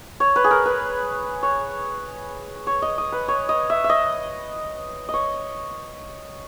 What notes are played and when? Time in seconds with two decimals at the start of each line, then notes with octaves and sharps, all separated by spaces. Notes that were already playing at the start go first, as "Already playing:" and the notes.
0.20 C#5
0.36 B4
0.44 G#4
0.51 A#4
0.66 B4
1.43 C#5
2.67 C#5
2.82 D#5
2.98 D#5
3.12 B4
3.28 C#5
3.49 D#5
3.70 E5
3.84 E5
3.89 D#5
5.09 C#5 D#5